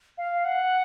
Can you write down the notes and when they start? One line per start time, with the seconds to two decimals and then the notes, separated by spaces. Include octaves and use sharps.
0.18 F5
0.45 F#5